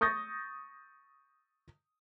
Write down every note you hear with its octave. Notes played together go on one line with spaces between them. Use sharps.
C#6 D#6 G6 A6 A#6